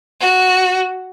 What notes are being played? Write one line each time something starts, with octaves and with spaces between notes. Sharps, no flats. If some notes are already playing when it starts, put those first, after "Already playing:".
F#4